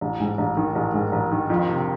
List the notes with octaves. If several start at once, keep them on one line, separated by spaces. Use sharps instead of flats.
A1
G#2
A1
D#3
A1
G#2
A1
D#3
F2
C3